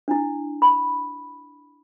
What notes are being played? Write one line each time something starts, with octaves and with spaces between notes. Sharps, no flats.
D4 E4
B5